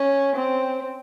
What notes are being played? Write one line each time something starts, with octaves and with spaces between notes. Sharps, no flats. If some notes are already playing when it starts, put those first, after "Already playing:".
Already playing: C#4
C4